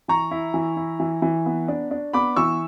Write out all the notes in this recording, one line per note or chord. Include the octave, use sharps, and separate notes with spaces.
E3 A#5 C#6
E4
E3
E4
E3
E3
B3
D4
D4
B3 B5 D6
E3 C#6 E6